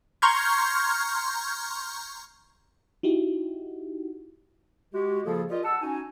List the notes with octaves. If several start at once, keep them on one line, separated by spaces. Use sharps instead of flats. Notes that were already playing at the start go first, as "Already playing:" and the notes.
A#5 C6 C#6 F6 G6 G#6
D#4 E4 F#4 G4
G#3 F#4 G4
C#3 F3 A#3 F4 G#4 A4
F4 G4 A#4 D5 D#5
F#5 A5 E6
C#4 D#4 F#4 G#5